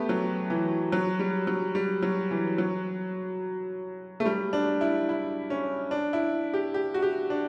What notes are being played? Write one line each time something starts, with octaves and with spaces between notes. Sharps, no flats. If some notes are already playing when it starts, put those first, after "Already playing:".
Already playing: A3 B3 G4
F#3
E3
F#3
G3
F#3
G3
F#3
E3
F#3
A3
G3
D4
E4
E4
C#4
D4
E4
G4
G4
F#4
G4
D4